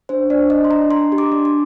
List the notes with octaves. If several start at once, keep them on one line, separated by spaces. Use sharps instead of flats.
D4 C5
D4 D5
D4 D#5
C6
D4 A#5
D4 C6
G4
D6
D4
C6